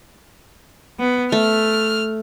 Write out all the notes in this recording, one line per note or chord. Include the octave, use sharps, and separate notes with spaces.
B3
A3 F6